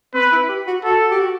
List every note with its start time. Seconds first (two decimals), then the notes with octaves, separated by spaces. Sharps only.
0.14 C4 B4
0.32 E4
0.49 G4
0.67 F#4
0.84 F#4 A4
1.11 G4
1.19 F#4